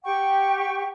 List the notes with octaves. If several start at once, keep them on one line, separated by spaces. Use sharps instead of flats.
G4 F#5 G5 C#6